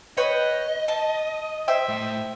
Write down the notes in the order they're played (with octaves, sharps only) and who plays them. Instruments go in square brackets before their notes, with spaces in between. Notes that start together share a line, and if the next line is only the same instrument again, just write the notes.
[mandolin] B4 C#5 G5 [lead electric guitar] D#5
[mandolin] A5
C5 E5 G5
[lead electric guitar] A2